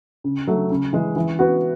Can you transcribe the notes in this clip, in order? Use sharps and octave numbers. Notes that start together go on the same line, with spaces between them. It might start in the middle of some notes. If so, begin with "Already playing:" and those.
C#3
F#3 A3
C#3
E3 G#3
E3
B3 F#4